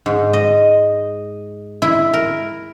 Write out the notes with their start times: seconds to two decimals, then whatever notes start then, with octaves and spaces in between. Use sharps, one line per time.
0.06 G#2
0.33 D#5
1.82 E4
2.13 A#4